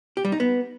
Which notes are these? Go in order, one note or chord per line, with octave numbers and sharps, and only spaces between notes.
G4
G3
D#4
B3